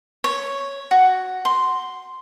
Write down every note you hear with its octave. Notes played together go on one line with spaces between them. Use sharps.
C#5
F#4
C6